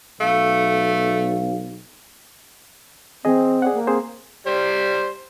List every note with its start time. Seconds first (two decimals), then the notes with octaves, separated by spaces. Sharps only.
0.20 B1 A3 F5
3.25 E3 C4 G#4 D#5
3.62 G#4 D5 F#5
3.75 A#3
3.87 C4 G#4 C5
4.47 G3 C5